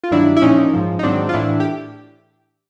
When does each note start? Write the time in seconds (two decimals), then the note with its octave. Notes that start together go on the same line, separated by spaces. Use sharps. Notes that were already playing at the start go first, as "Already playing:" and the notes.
0.04 F4
0.11 G2 D#3 F#3 D4 E4
0.36 E4
0.42 A#2 F3 C#4 D#4
0.73 G#2 F3
0.99 D#4
1.03 G#2 D#3 F#3 C4 D4
1.29 F4
1.33 A2 E3 D4 E4
1.60 G4